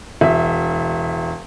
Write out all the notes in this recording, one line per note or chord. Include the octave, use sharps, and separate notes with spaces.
E1 E5